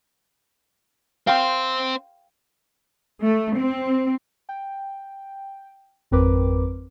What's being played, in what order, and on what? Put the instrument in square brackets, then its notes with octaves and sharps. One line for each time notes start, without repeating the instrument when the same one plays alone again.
[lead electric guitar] C4 C5 [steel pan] F5 G5 C6
[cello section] A3
C4
[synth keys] G5
G#1 F2 C4 A#4 B4 D6